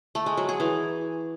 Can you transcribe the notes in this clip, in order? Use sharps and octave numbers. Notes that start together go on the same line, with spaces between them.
A3
G#3
F#3
G#4
E3